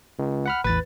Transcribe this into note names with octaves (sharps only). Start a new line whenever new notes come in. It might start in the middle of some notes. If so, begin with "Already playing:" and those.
C#2
F#5 B5 F6
A1 E2 B4 A6